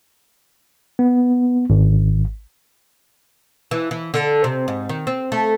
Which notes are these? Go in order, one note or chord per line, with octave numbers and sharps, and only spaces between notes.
B3
G#1
E3
E3
D3
C3
G#2
D#3
C4
A3